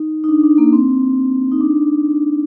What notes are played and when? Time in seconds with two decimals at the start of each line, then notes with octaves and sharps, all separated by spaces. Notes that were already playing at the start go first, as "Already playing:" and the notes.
Already playing: D#4
0.24 D#4
0.29 D4
0.43 D4
0.58 A#3
0.73 C4
1.52 D#4
1.61 D4